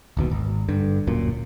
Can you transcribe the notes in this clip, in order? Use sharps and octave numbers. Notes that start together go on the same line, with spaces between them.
D1 D#2 B2
G#1
G2 D3
D1 F#2 A#2